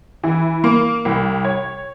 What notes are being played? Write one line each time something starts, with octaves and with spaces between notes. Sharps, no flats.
E3
A#3
C2
C#5